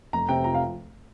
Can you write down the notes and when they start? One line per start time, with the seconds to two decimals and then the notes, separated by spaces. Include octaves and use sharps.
0.13 F1 A#5
0.29 C3 G5
0.44 F3 A#5
0.54 F5